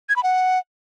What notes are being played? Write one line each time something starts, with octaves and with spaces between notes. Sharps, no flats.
G#6
B5
F#5